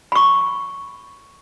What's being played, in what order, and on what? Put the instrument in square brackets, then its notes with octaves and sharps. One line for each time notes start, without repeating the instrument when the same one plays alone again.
[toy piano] B5 C#6